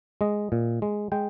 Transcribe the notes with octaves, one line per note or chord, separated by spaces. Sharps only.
G#3 D#5
A#2
G#3
G#3 G5